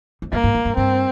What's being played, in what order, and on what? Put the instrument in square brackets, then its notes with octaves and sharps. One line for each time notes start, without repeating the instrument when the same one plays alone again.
[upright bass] F2
[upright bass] G2 [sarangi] A#3
[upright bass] G#2
G#2
G2
[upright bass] G2 [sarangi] C4